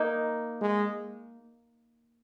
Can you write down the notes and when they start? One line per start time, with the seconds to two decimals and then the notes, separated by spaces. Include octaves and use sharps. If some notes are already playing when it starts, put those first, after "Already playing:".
Already playing: A#3 D#4
0.61 G#3